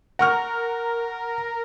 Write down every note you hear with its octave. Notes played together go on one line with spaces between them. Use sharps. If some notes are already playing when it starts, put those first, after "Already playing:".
A#4 F#5 C#6 F6